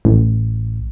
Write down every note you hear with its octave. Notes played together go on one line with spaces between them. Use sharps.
A1